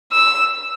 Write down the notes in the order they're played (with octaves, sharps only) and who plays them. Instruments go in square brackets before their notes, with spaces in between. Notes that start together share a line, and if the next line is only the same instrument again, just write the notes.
[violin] E6